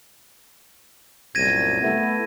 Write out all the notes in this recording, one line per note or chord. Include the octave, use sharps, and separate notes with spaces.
C2 F#2 A#2 G#6 A#6 D#7
A3 B3 E4